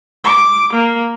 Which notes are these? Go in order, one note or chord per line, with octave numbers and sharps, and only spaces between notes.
D6
A#3